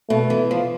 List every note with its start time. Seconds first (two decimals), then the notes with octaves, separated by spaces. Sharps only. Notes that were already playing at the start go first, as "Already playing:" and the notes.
0.10 B2 A3
0.30 E3
0.51 F3